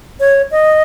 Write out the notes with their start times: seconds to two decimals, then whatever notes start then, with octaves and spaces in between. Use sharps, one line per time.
0.20 C#5
0.51 D#5